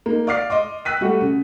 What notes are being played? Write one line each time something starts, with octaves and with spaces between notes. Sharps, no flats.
A#3 D#4
D5 F5 D6 F6 A6 C7
D#5 C6 D6
G5 E6 F#6 B6 D#7
G3 A3 F#4
C#3